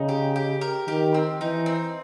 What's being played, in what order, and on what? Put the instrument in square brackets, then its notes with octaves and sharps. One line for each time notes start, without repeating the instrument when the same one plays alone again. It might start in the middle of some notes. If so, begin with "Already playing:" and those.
Already playing: [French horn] C#3 [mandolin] D#4
[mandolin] G4
G4
A#4
[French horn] D#3 [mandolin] G4
[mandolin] C4
[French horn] E3 [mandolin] D#4
[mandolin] C4